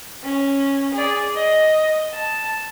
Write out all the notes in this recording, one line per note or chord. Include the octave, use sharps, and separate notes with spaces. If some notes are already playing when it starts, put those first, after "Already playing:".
C#4
G#4 D5
D#5
A5